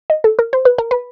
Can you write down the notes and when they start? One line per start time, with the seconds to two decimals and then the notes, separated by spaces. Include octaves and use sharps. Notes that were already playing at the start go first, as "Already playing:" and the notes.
0.10 D#5
0.24 A4
0.39 A#4
0.53 C5
0.65 B4
0.78 A#4
0.91 B4